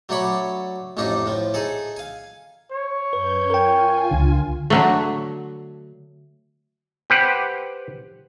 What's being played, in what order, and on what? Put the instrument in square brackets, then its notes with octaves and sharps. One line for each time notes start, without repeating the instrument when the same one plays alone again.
[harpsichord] F#3 A3 D4 C#5 B5
A1 F2 A3 D4 D#4 A#5
A2 F3
D#4 G#4 A4
F5 G#5
[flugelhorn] C#5
[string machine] F#2 G6 G#6 [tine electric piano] B4
[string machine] F4 G#5 [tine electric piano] A#4 G5
[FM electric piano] C#2 D3
[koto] D3 F#3 A3
[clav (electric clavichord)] G4 B4 C5 F#5 G5